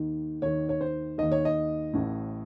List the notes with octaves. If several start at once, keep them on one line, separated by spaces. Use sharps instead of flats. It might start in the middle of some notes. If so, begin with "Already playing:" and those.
Already playing: D#2 D#3
D#2 D#3 C#5
C#5
C5
D#2 D#3 D#5
C#5
D#5
A1 A2